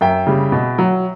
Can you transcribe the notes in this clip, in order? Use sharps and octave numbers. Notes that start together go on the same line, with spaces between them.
F#2 E5 G5
C#3 G3
B2
F#3